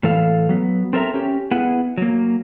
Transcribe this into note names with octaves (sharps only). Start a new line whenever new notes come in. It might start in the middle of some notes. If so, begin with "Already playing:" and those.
A2 E3 A4 F5
F#3 B3
C4 A4 A#4 C5 E5 A#5
C#4 G4
B3 E4 G#4 F#5
F#3 A#3